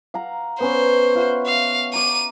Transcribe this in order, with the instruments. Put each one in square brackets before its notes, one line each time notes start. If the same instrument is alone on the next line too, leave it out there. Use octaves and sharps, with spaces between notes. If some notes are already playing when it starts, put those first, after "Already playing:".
[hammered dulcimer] F5 F#5 A#5
[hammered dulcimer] B3 C#4 C#5 [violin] C5
[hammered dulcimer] F4 E5 F#5
[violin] F5
[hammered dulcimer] A#5 D6 [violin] D#7